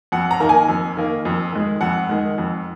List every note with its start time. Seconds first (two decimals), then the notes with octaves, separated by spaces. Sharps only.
0.12 F2 F#5
0.31 A#5
0.40 D#3 A#3
0.49 G#5
0.68 F2
0.97 D#3 A#3
1.25 F2
1.53 D#3 G#3
1.81 F2 F#5
2.09 D#3 G#3
2.38 F2